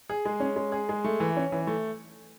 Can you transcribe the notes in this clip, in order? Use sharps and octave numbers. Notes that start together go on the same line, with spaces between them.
G#4
G#3
C#4
G#3
G#4
G#3
A3
E3
C#4
E3
A3